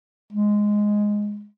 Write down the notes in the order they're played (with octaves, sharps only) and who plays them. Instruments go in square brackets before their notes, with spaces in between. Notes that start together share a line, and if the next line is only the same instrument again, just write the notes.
[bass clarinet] G#3